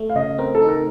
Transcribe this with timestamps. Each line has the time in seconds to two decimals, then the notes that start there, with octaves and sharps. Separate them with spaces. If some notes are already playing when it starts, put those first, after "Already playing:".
Already playing: A3
0.10 F5
0.16 C#3 D#5
0.38 C4 A#4
0.55 A4
0.62 D#4
0.69 A#4